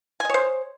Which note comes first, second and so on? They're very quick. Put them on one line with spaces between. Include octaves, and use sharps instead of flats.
G#5 D#5 C#5 C5